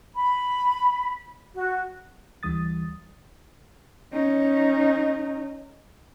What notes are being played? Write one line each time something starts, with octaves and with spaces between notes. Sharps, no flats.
B5
F#4
D2 E3 G3 D#6 A6
C#4 D#4